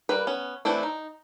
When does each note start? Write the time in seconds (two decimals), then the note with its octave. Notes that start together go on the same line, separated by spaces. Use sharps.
0.09 G3 A#3 B4
0.27 B3 C#4
0.65 E3 A3 C4 D4 E4
0.83 D#4